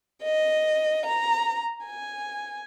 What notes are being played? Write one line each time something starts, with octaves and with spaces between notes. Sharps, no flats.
D#5
A#5
G#5